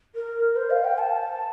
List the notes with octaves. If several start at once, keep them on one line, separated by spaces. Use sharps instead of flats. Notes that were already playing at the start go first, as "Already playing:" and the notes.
A#4
C5
F5
G5
A5